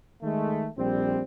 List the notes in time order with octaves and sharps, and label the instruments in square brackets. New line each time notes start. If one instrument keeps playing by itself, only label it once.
[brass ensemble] D#3 G#3 A3
A#1 G3 C4